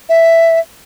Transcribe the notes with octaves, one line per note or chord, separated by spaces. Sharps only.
E5